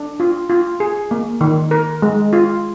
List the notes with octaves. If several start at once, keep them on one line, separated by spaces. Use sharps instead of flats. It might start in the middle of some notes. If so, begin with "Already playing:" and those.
Already playing: D4
F4
F4
G#4
A#3
D#3
A#4
G#3
F4